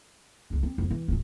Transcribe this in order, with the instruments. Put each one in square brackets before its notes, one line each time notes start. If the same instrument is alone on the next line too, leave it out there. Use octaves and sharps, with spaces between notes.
[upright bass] C#2 D4
C4
F2 D3
E3
D1 F4